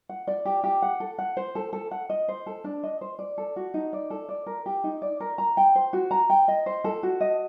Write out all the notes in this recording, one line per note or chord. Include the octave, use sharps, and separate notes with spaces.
F#5
D5
G4
G4
F#5
A4
F#5
C5
A4
A4
F#5
D#5
C5
A4
D4
D#5
C5
D5
A4
F#4
D#4
D5
A4
D5
A#4
G4
D#4
D5
A#4
A#5
G5
C5
F#4
A#5
G5
D#5
C5
A4
F#4
D#5